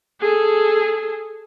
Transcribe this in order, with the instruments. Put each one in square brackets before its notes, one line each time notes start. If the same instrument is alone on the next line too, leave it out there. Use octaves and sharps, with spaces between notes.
[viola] G#4 A4